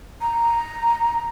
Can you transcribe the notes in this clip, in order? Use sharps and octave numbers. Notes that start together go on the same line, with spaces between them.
A#5